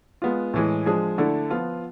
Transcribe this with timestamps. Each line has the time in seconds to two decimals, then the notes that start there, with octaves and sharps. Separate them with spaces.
0.22 G#3 B3 F4
0.54 A2 E3 G#3
0.86 F3 G#3 D4 G#4
1.18 D3 A3 E4 A4
1.50 F3 B3 F4